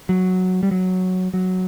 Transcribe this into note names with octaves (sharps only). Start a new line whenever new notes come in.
F#3
G3
F#3
F#3